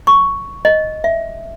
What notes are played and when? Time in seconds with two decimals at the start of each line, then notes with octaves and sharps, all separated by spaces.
0.07 C#6
0.65 D#5
1.04 E5